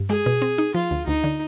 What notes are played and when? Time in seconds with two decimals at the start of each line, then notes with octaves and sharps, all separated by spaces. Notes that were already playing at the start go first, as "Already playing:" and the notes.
Already playing: G2
0.09 G#3 G#4
0.26 B2
0.42 C4
0.58 D#4
0.74 F3 F4
0.91 D2
1.07 D2 D#4
1.24 D3